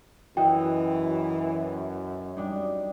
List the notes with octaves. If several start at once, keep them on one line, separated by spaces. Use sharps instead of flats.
F#2 E3 F#4 D#5 E5 G5
G3 D4 D#4